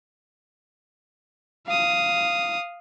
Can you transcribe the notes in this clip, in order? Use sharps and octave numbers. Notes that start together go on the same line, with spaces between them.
F5 D#6